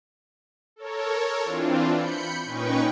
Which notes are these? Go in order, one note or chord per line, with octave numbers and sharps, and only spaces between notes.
A4 A#4 C#5
E3 C4 D4 F4
B5 G6 C#7
A#2 C#4 D#4 B4 G5 C#6